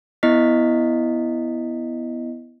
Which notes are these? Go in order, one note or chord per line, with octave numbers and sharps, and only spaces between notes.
B3 E4 D#5 B6